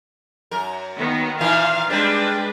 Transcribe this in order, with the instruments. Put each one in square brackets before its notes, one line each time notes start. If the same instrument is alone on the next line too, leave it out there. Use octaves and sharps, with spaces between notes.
[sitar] F#2 A#4
[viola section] D#3 B3
[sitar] A#2 D#3 E3 [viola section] F5
[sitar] G3 C4 [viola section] G#3 D4 B4